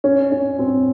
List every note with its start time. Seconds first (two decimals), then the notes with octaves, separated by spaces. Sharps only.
0.04 C#4
0.32 C#4
0.59 C4